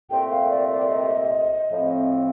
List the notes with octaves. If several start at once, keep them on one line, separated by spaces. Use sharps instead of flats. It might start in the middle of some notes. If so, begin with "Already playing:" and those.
C2 A#2 A3 C4 G5
F5
D5
D5
D#5
A2 F3 C4